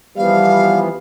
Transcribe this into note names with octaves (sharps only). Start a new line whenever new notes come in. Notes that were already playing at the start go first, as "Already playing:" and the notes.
E3 F3 G3 B3 F5